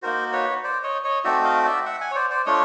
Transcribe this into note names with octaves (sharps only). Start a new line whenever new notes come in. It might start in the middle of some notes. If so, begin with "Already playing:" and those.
A#3 D#4 F#4 A#4 C5
B4 C#5
C5 D5
C#5 D#5
C#5 D#5
A3 C4 D#4 F#4 D5 E5
D#5 F5
D5 E5
E5 F#5
F#5 G#5
C#5
C5 D5
C5 D5
A3 D4 F4 C#5 D#5